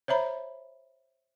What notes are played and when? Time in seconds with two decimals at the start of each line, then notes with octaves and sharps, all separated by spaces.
0.08 C5 C#5 E5 A#5 B5